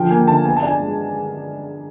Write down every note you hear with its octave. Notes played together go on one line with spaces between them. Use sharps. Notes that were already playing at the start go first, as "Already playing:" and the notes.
Already playing: D3 F3 G5
A#3 G#5
D3 A5
B3 G#5
A5
D4 G#5
G#3